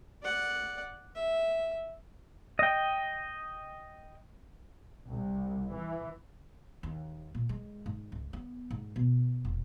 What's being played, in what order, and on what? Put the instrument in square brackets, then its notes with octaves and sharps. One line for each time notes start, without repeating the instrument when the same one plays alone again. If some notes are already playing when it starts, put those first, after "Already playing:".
[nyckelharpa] D5 F#5
E5
[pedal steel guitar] D#5 G5
[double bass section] C2
E3
[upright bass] D#2
A#2
G#3
G#2
C#2
B3
G#2
B2
E1